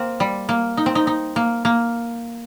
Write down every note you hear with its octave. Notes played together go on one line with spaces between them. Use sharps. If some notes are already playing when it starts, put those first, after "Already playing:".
Already playing: A#3 C4
G3
A#3
D#4
C4
D#4
D#4
A#3
A#3